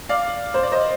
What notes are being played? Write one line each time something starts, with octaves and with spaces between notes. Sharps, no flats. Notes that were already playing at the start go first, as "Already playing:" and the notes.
D5 F5
C5
D5
C5 D#5